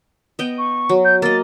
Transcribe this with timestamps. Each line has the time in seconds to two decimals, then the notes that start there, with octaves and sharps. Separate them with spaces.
0.39 B3 D#5 G5
0.58 C#6
0.89 F#3
1.04 G6
1.22 A#3 D#5 A6